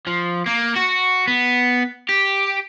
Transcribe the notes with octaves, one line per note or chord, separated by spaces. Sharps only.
F3
A#3
F#4
B3
G4